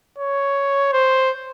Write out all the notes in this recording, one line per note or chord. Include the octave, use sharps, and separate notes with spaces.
C#5
C5